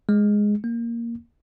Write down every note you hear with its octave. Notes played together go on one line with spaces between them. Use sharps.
G#3
A#3